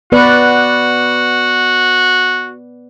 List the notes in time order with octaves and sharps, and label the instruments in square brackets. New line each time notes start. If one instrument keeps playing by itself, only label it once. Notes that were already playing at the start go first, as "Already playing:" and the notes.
[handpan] B3 B4 D5 [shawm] F#4